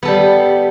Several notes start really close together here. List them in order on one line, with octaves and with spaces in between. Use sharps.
B3 A4 G3